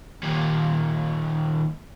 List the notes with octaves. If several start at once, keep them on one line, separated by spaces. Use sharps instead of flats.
D#2 A#2